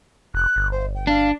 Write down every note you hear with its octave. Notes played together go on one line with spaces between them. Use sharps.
F1 F#6
G1
C5
G5
D4 F5